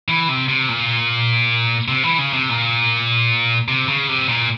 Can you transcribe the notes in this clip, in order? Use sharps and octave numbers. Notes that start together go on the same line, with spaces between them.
E3
C3
C3
A#2
C3
E3
C#3
C3
A#2
C3
C#3
C3
A#2